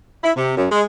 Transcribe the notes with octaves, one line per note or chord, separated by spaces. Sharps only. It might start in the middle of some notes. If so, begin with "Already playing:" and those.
E4
C3
F#2
G#3